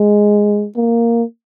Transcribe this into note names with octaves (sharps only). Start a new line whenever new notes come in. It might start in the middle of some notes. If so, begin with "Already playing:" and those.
Already playing: G#3
A#3